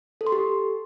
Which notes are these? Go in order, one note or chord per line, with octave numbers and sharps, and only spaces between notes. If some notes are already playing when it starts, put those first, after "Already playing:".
A4
C6
G4